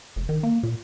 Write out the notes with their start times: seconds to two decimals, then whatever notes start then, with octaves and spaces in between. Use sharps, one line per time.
0.16 F1
0.29 D#3
0.43 A#3
0.63 A#2